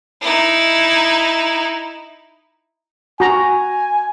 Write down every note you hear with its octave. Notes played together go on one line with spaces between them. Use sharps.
D#4 E4
F#4 G#5 A#5